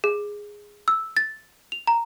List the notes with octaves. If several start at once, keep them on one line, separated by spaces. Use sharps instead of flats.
G#4
E6
A6
F7
A#5